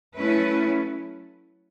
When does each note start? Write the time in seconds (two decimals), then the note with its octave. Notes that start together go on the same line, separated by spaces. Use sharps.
0.16 F#3 A3 C#4 E4 B4